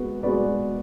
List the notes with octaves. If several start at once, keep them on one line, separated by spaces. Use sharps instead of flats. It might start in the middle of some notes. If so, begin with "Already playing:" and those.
Already playing: G#3 B3 F#4 B4
G#3 B3 F#4 B4 D5